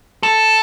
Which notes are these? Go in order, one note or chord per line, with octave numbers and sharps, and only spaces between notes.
A4